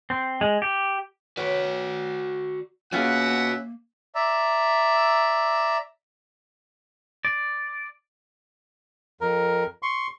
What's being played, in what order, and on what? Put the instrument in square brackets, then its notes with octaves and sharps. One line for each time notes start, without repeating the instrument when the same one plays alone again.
[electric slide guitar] C4
G#3
G4
[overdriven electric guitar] F#4 D5 [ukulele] B4 C#5
[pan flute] A#3 [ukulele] C#4 F4 G#4 [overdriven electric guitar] F#4 B4 [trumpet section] E5 F#5
[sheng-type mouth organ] D5 E5 A#5 E6
[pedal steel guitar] D5
[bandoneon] F2 A#4
C6 C#6